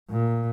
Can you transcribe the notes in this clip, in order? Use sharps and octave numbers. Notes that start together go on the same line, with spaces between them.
A#2